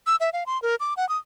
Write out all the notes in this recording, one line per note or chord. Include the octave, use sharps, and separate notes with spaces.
E6
E5
F5
C6
A#4
D6
F#5
D#6